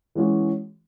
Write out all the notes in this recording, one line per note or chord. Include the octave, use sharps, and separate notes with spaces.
E3 G#3 C#4 F#4